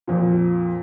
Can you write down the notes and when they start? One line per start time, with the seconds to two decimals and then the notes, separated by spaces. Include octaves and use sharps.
0.07 F2 A#2